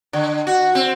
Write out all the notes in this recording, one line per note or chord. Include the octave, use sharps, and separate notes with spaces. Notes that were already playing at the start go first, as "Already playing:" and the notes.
D3
F#4
C4